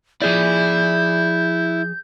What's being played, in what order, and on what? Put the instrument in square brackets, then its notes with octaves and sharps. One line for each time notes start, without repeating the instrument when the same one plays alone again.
[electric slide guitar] F3 G#4 D5 [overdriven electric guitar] E4 [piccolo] G6